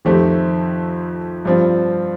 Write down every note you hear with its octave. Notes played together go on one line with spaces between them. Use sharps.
F2 D#3 A3 C4 G4
G2 F3 C4